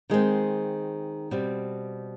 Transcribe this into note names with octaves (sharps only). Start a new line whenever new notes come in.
D#3 G#3 C4
B2 G3 C4